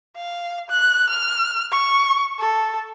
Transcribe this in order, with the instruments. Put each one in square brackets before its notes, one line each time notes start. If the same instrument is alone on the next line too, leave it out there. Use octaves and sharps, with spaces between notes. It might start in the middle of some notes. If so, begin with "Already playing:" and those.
[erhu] F5
F#6
F6
C#6
A4